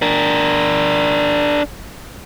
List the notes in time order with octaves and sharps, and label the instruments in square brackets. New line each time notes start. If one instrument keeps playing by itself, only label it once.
[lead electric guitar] D4 A#4